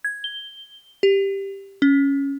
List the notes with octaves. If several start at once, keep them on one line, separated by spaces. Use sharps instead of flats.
G#6
G7
G4
C#4